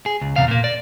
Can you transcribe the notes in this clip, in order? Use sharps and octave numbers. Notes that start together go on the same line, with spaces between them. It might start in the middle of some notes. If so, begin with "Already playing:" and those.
G#4
C#2
E2 C3 F5
A#2 A#3
D5